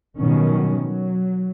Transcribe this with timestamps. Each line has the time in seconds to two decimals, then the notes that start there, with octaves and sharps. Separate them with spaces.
0.17 B2 D#3 F#3 G3 C#4
0.84 F#3